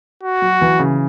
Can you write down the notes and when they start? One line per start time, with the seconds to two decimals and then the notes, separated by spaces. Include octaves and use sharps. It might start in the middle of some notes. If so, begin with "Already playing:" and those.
0.23 F#4
0.42 F#3
0.61 E3
0.79 C#3